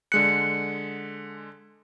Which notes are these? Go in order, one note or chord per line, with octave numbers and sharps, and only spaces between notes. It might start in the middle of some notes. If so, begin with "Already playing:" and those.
D3 G#3 F#6 C#7